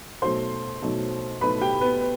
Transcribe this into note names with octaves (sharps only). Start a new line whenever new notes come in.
B2 F#3 A3 D#4 C5 C6
B2 F#3 A3 D#4
B2 F#3 A3 D#4 B4 B5
G4 G5
B3 B4
B4